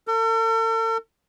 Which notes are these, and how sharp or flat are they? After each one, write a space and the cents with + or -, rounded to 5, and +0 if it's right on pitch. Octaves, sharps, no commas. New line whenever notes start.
A4 +45